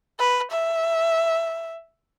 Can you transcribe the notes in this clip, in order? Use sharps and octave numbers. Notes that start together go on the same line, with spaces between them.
B4
E5